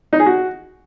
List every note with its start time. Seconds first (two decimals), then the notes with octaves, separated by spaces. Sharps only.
0.13 D#4
0.19 G#4
0.26 F#4